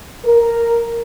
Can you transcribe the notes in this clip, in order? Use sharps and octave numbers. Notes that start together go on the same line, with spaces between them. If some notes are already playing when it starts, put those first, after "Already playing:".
A#4